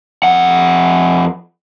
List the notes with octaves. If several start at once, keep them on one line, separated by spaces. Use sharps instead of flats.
F2 F#5